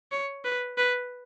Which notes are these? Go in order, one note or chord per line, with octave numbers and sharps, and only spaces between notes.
C#5
B4
B4